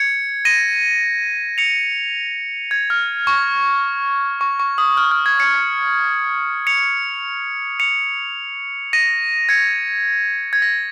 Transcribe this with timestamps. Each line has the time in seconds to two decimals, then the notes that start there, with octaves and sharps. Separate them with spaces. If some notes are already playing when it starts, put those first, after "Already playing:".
Already playing: G#6 C#7
0.45 A#6 D#7
1.58 C#7 F7
2.71 G#6
2.90 F6
3.27 C#6
4.41 C#6
4.60 C#6
4.78 D#6
4.97 F6
5.11 F6
5.26 G#6
5.39 G#6 C#7
6.67 C#7 F7
7.80 C#7 F7
8.93 A#6 D#7
9.49 G#6 C#7
10.53 G#6
10.62 A#6